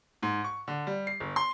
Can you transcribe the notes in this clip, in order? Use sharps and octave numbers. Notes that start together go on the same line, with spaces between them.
G#2
C#6
D3
G3
C7
G1
C6